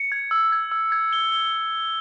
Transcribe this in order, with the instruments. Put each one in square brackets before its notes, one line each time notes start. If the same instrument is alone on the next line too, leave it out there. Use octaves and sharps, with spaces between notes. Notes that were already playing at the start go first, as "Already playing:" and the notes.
Already playing: [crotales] C#7
G#6
E6
G#6
E6
G#6
G7
G7